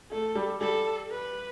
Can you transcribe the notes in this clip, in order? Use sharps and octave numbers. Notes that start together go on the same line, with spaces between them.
A3 A4
G3
G3 A4
B4